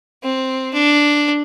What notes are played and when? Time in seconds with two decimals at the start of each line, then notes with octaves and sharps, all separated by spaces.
0.22 C4
0.73 D4